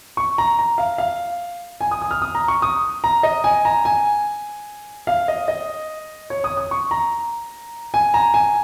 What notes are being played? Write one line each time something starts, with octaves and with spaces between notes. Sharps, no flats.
C#6
A#5
A#5
F5
F5
G#5
D#6
D#6
F6
D#6
A#5
C#6
D#6
A#5
D#5
G#5
A#5
G#5
F5
D#5
D#5
C#5
D#6
D#6
C#6
A#5
G#5
A#5
G#5